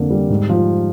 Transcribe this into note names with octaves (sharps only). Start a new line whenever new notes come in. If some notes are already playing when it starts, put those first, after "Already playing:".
Already playing: F2 D3 A#3
G3
G#2
F3